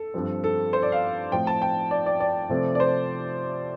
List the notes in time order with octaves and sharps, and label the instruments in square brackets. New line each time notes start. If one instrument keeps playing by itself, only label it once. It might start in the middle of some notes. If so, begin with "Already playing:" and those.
Already playing: [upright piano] A4
G2 F3 C4
A4
C5
D5
F5
A2 F3 C4 G5
A5
G5
D5
D5
D5
C3 F3 A3 C4
D5
C5